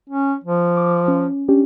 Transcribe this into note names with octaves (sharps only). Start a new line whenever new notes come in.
C#4
F3
D6
C#4
C#4 D4 G4